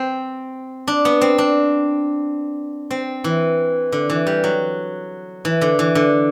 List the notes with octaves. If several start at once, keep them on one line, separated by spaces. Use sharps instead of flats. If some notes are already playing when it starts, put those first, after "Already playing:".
Already playing: C4
D4
B3
C4
D4
C4
E3
D3
E3
G3
F#3
E3
D3
E3
D3